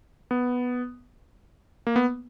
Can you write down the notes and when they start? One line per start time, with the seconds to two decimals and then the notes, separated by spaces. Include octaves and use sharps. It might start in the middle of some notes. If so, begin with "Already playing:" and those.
0.31 B3
1.87 A#3
1.96 B3